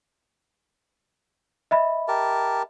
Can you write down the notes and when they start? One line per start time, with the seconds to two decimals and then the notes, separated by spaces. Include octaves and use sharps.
1.71 D#5 E5 B5
2.08 G4 A#4 A5